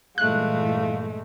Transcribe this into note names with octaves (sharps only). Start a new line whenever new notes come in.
G2 A#2 E3 G#3 A3 F5 F#6